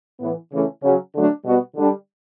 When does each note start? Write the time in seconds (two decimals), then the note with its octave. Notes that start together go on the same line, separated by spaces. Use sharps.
0.19 A2 E3 B3
0.51 C#3 E3 A3 C#4 E4
0.82 C#3 F#3 C#4
1.13 D3 F#3 A3 D4
1.45 B2 G3 B3 F#4
1.76 D3 G3 D4